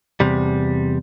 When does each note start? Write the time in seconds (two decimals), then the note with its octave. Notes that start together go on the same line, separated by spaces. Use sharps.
0.20 E2 C3 G3